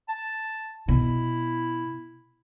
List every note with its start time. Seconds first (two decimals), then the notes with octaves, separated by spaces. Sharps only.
0.09 A5
0.88 B2 E4